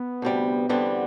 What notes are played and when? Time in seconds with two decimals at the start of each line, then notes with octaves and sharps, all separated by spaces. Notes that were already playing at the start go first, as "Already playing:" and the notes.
Already playing: B3
0.22 D2 C3 G3
0.69 E2 D3 G3 B3 C4